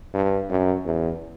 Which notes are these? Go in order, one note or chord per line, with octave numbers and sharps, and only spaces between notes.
G2
F#2
E2